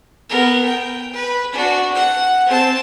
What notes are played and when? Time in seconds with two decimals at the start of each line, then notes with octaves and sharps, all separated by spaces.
0.30 B3 A#4
0.65 G5
1.12 B4
1.52 D4 F#4
1.94 F#5
2.47 C4 A5